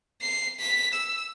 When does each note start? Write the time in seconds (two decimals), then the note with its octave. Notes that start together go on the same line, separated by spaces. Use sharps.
0.22 C7
0.60 B6
0.93 E6